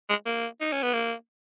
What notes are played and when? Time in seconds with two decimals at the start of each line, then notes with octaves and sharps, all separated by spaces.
0.09 G#3
0.26 A#3
0.61 D#4
0.72 C#4
0.82 B3
0.93 A#3